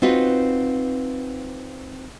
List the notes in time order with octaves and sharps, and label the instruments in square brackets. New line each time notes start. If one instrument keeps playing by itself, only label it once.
[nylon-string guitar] C4 D#4 F4 F#4 B4